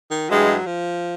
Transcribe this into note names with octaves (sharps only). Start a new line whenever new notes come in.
D#3
G2 E3 F#3 G#3
F3